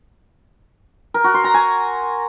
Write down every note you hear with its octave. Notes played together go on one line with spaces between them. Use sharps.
A#4
F#4
C6
A#5
G#5